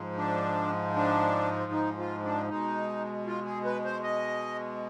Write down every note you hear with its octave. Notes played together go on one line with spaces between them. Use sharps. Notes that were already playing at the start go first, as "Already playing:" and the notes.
Already playing: G#2 F3 G#3
D4
D4
D#4
F4
D4
B2 G#3 D#4
F4
G#4
B4
C5
D#5